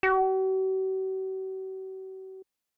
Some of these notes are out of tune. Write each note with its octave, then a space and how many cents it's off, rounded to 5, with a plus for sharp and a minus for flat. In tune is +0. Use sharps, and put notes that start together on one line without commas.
F#4 +45